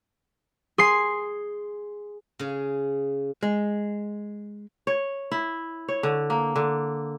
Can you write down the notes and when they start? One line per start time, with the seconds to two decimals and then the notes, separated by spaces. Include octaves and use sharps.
0.78 G#4 C6 C7
2.39 C#3 G#4
3.43 G#3
4.87 C#5
5.32 E4
5.89 C#5
6.03 D3
6.30 A#3
6.56 D3